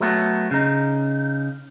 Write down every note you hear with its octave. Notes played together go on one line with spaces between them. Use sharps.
F#3 A3 B3
C#3 D#4